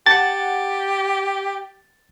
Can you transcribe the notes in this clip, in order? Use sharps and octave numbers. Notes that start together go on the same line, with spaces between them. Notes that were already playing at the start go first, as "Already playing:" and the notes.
G4 F#5 A5 A6